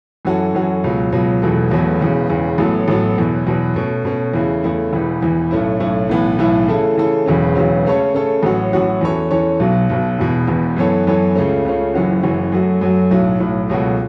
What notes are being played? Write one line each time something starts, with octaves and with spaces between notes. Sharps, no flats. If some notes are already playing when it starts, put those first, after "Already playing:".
F#2 E3 C#4 F#4 A4
F#2 E3 C#4 F#4 A4
C#2 B2 F#3
C#2 B2 F#3
E1 E2 B2 F#3 A3
E1 E2 B2 F#3 A3
E1 E2 C#3
E1 E2 C#3
A1 A2 F#3 B3 A4
A1 A2 F#3 B3 A4
E2 B2 F#3
E2 B2 F#3
B2 A3 C#4
B2 A3 C#4
E2 C#3 A3 E4
E2 C#3 A3 E4
E1 E2 E3
E1 E2 E3
B1 A2 A3 C#4 E4
B1 A2 A3 C#4 E4
B1 A2 E3 B3 E4
B1 A2 E3 B3 E4
C#3 E3 A3 E4 A4
C#3 E3 A3 E4 A4
E1 E2 C#3 F#3 C#4
E1 E2 C#3 F#3 C#4
C#3 A3 C#4 A4 C#5
C#3 A3 C#4 A4 C#5
A1 A2 F#3 C#4 F#4
A1 A2 F#3 C#4 F#4
E2 E3 C#4 A4 C#5
E2 E3 C#4 A4 C#5
B1 B2 F#3
B1 B2 F#3
E1 E2 B2
E1 E2 B2
F#2 E3 B3 A4 C#5
F#2 E3 B3 A4 C#5
C#2 C#3 A3 C#4
C#2 C#3 A3 C#4
F#1 F#2 E3 C#4 F#4
F#1 F#2 E3 C#4 F#4
F#2 F#3 A3 F#4
F#2 F#3 A3 F#4
B1 A2 F#3
B1 A2 F#3
C#2 B2 F#3 A3 F#4